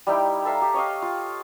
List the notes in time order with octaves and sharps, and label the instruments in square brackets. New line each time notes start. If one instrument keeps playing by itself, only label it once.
[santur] G3 D#4 E4 G5
A4 E5 F5 A#5
G4
C#5 D#5 F5
F4